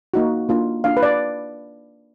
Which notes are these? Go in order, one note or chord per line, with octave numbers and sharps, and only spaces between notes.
A#3 D#4 F#4
A#3 D4 F4
A#3 D4 F4 F5
B4
D5